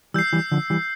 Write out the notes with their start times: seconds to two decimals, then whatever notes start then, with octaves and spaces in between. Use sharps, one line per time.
0.14 E3 G3 E6 G6 C7
0.33 E3 G3
0.51 D3 F3
0.70 E3 G3